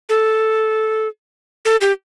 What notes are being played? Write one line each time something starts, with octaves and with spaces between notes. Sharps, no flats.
A4
A4
G4